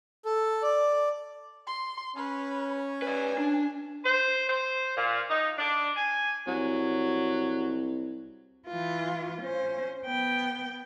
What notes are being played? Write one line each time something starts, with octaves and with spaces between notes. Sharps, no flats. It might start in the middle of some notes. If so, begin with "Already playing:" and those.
A4
D5
C6
C#4 B4
B4 D5 G#5
D4
C5
C5
A#2
D#4
D4
G#5
C2 F#3
E3 F4
C#4 C5
B3 G5